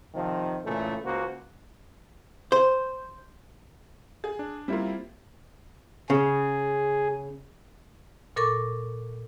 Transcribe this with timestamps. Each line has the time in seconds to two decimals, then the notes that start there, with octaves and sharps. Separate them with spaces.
0.14 C3 D#3 F3
0.64 A#2 C#3 E3 A3
1.04 C#2 A#3 F#4 C5
2.52 C5
4.24 G#4
4.39 D4
4.68 G3 A#3 C4 E4 F4
6.10 C#3 G#4
8.36 A#2 A4 A#4 C#6 D6